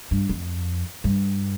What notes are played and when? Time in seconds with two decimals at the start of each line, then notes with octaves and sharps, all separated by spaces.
0.11 G2
0.29 F2
1.04 G2